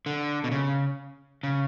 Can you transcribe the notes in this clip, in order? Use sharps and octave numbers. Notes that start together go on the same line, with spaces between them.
D3
B2
C#3
C#3